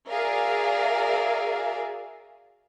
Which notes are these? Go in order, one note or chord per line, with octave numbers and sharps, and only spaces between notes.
F#4 G#4 A#4 D5 E5 F5